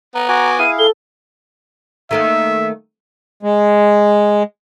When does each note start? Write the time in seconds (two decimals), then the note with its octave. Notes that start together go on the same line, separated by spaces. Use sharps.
0.15 B3 A#5
0.29 F#4 G#5 D6
0.59 E4 G#4 F5 D#7
0.79 A4 G7
2.11 D#3 A3 A#3 E5
3.43 G#3